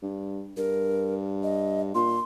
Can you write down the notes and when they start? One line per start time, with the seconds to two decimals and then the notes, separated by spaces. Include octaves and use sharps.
0.02 G2
0.57 G2 A#4
1.43 D#5
1.95 A#2 C6